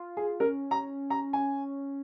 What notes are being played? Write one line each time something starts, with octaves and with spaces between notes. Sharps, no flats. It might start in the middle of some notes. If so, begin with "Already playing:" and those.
Already playing: F4
G#4
C#4 A#4
A#5
A#5
G#5